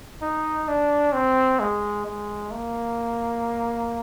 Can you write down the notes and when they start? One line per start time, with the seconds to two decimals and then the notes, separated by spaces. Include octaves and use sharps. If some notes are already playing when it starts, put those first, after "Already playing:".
0.22 D#4
0.68 D4
1.14 C4
1.60 G#3
2.06 G#3
2.51 A#3